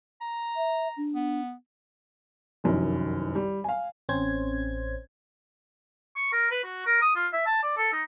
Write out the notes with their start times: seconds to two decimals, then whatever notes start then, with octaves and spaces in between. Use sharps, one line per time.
0.21 A#5
0.56 E5
0.97 D4
1.15 B3
2.64 F1 C2 F#2 D#3
3.35 G3
3.64 F5 G#5
4.09 A1 C4 C#4 C5 G#6
6.16 C#6
6.32 A#4
6.51 B4
6.64 F#4
6.86 A#4
7.02 D#6
7.16 F4
7.33 E5
7.46 A5
7.63 D5
7.77 A4
7.93 D#4